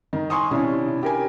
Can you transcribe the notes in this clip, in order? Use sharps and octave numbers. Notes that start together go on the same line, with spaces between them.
D#3
G#5 C6 C#6 D#6
C3 C#4 D4 E4
G4 A#4 G#5